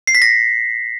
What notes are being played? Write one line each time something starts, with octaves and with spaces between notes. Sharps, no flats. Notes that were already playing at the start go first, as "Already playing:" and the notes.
C7
B6
A#6